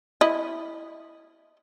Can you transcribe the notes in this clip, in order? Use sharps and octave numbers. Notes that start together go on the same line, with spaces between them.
E4 D#5